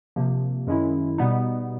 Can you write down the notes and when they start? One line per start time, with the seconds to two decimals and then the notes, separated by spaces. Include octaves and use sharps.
0.16 C3 F3 A#3
0.67 F#2 D#3 G#3 C#4 E4
1.18 B2 G3 B3 D#4